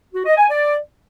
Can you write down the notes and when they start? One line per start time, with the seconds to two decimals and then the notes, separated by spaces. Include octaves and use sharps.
0.14 F#4
0.26 D#5
0.37 G#5
0.49 D5